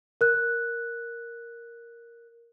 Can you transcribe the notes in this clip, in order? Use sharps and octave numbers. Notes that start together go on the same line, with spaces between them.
A#4 F#6